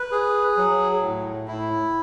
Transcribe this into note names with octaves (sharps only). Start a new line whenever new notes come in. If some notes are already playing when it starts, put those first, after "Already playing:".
Already playing: B4
G#4
F#3
A2
E4